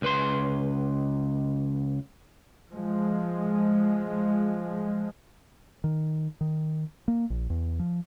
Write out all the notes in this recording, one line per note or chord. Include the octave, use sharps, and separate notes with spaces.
C#2 B4 C6
F3 G#3
D#3
D#3
A#3
A#1
E2
F3